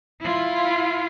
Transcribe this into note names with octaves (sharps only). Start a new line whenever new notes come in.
E4 F4